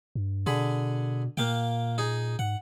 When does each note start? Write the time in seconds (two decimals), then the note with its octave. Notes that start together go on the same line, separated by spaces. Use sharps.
0.15 G2
0.46 B2 D3 G#4 B5
1.37 A#2 A#3 F5 G5
1.98 D#4 G#4
2.39 G#2 F#5